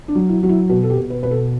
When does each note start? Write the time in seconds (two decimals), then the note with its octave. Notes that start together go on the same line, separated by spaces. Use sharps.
0.08 D4
0.15 F#3
0.29 E4
0.43 F#3 F#4
0.49 E4
0.69 B2 F#4
0.83 A4
0.90 G4
0.97 B2
1.10 B4
1.23 B2 B4
1.31 A4